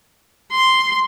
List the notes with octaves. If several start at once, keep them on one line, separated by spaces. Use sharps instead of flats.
C6